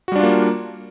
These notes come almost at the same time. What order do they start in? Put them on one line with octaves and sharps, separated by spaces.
F#4 G3 D4 F4 A#3